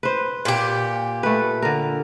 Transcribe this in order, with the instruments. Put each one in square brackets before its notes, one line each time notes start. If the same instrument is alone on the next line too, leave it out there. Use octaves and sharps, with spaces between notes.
[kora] B4 C5
[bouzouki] A#2 G4
[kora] A3 B4
D3 A#4